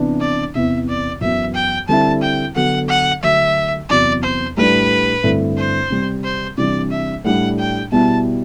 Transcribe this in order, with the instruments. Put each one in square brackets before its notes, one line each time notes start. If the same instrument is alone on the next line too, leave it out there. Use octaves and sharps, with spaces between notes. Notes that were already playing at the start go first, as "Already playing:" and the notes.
Already playing: [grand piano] C3 E3 B3 D4
[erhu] D5
[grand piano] E2 C3 E3 B3 [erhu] E5
[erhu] D5
[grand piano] F#2 E3 B3 [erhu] E5
[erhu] G5
[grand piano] D3 G3 C4 E4 [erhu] A5
[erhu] G5
[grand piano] D3 F#3 B3 [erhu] F#5
[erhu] F#5
[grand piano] D3 F#3 A3 [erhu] E5
[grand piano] E2 C3 F#3 B3 [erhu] D5
[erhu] C5
[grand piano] A2 G3 D4 [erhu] B4
[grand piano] G2 D3 A3 C4 E4
[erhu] C5
[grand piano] C3 G3 C4
[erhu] C5
[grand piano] C3 E3 G3 D4 [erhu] D5
[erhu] E5
[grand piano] A2 G3 D4 [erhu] F#5
[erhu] G5
[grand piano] B2 G3 B3 E4 [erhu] A5